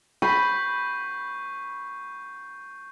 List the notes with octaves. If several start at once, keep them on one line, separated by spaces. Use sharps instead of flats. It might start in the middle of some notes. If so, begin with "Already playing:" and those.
B5 C#6 G6 C7